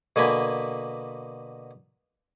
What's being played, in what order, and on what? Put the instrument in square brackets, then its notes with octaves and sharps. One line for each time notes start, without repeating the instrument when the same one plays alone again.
[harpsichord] B2 D3 A#3 G#5 B5